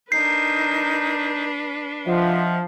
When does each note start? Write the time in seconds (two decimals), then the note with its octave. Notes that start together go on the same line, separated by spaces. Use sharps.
0.12 D4 D#4 A#4 B4 G6 C7
2.06 F3 D#5 E5 F#5